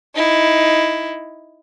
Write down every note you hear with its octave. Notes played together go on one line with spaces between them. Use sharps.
D#4 E4